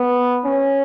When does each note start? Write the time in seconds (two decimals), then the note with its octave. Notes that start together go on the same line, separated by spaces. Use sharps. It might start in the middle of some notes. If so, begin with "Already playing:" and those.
Already playing: B3
0.45 C#4